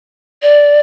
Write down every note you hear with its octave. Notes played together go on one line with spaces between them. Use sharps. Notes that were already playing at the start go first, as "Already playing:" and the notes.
D5